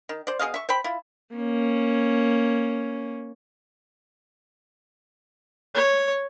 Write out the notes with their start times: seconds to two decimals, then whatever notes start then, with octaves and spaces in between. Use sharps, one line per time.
0.09 D#3
0.27 C5 D5
0.39 B2 G#4 D#5 F5
0.54 E5 C#6
0.69 C5 G5 B5
0.84 E4 F4
1.35 A#3 C#4
5.75 C#5